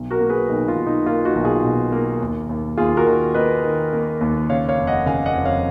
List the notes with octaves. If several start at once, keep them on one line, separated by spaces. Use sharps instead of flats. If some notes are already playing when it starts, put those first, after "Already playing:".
Already playing: B1
F#4 A#4
A#3
G#4 B4
B1 D#4
F4
B1
D#4
A#3 F4
D#4 F#4
B1
F4 G#4
B2
A#3
D#2
D#2
D#2 F4 G#4
F#4 A#4
D#3
A#3 B4 D#5
D#3
A#3
D#2
C#3 C#5 F5
C#5 F5
F1
D#5 F#5
C#3 F5 G#5
D#5 F#5
F2
C#5 F5